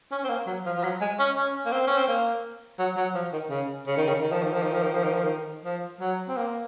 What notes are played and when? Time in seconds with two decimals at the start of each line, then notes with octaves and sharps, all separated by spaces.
0.11 C#4
0.24 C4
0.29 A#3
0.47 F#3
0.66 F3
0.77 F3
0.84 F#3
1.01 G#3
1.19 C#4
1.37 C#4
1.66 A#3
1.72 C4
1.87 C#4
1.98 C4
2.08 A#3
2.79 F#3
2.97 F#3
3.15 F3
3.33 D#3
3.50 C#3
3.87 C#3
3.97 D#3
4.08 C#3
4.22 D#3
4.32 F3
4.43 D#3
4.53 F3
4.63 D#3
4.73 F3
4.83 D#3
4.94 F3
5.04 D#3
5.13 F3
5.24 D#3
5.65 F3
6.00 F#3
6.28 C4
6.37 A#3